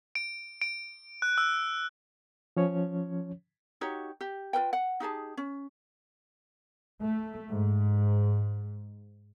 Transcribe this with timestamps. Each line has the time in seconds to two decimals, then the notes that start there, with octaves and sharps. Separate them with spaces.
0.15 D7
0.62 D7
1.22 F#6
1.38 E6
2.57 F3 C#4 C#5
3.81 D#4 F#4 G4 C#5
4.21 G4
4.53 F4 A#4 B4 G5
4.73 F#5
5.00 D#4 G4 G#4 A5
5.37 C#4
7.00 A3
7.51 G#2